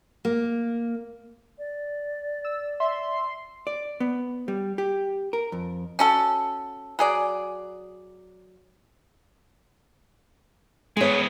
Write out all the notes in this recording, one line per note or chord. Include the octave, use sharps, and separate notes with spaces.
A#3
D5
E6
E5 C6
D5
B3
G3
G4
A#4
F2
C#4 F#4 A4
F#3 G#4 D5
G#3 B3 G#4 C#5